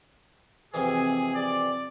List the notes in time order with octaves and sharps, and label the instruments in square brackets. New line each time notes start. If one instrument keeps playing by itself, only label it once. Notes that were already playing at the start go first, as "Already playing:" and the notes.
[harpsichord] F2 C3 E3 [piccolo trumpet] G#4
[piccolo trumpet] D5